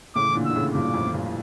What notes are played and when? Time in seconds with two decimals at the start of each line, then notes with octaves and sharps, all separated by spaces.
0.15 A2 C#3 D6
0.27 E3
0.35 A#2 D3
0.45 D3 E6
0.55 A2 C#3
0.74 G2 A#2 D6
0.94 F2 A2
1.06 A2
1.13 G2 A#2